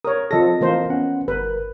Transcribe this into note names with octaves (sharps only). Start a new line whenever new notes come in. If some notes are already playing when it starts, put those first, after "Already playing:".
A#4 C#5 D#6
F3 C4 A4 D#5 A#6
E3 A#3 C5
B3 C#4 F#5
G1 A#4 B4